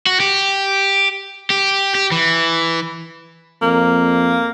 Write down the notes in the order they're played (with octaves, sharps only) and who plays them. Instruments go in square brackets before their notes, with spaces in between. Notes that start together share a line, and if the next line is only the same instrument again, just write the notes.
[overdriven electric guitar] F#4
G4
G4
G4
E3
[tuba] F2 [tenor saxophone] A#3